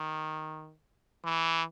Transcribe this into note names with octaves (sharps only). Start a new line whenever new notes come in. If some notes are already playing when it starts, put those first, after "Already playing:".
Already playing: D#3
E3